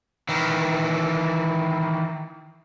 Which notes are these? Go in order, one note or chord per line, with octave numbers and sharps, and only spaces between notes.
D#3 E3